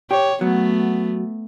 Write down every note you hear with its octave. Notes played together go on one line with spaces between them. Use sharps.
G4 C#5
F#3 A3 B3